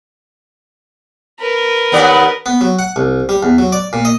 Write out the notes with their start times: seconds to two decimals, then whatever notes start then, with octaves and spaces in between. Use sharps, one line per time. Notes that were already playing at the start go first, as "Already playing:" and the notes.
1.40 A#4 B4
1.92 D#2 B3 D5
2.46 B3
2.61 F#3
2.79 F#5
2.96 C2
3.29 G3
3.43 E2
3.58 F#3
3.72 D5
3.93 A#2
4.05 D#5